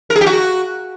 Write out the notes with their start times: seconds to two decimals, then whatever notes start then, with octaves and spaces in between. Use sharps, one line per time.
0.10 A#4
0.16 G#4
0.21 G4
0.26 F#4